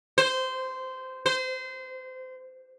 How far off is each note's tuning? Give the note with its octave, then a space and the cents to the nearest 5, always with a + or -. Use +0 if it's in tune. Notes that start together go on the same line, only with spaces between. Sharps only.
C5 -15
C5 -25